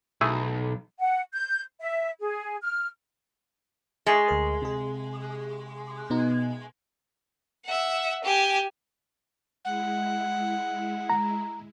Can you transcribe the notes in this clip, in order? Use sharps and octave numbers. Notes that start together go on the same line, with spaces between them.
B1 A3 E4 G#4
F#5
G6
E5
G#4
F6
G#3 C#6 D#6 A6
D2 A#4
C3 G#4
B2 B3 D#4
E5 F#5
G4 G#5
G#3 E4 F#5
A#5